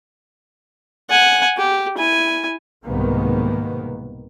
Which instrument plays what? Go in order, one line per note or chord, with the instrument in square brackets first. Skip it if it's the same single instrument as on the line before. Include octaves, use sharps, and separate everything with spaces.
[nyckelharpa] F#5 G#5
G4
E4 G#5
[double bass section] C2 G#2 B2 D#3 A#3 B3